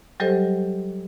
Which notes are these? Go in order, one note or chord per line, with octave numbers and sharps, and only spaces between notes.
F#3 G3 G4 A4 C5 D#5